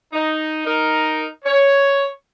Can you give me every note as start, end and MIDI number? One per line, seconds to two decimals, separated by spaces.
0.13 0.63 63
0.66 1.26 63
0.66 1.26 70
1.45 2.07 73